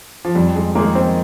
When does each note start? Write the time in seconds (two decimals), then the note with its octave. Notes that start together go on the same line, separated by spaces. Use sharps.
0.25 F3
0.35 F2 G3
0.56 G#3
0.75 D#3 G#3 A#3 D#4
0.95 C4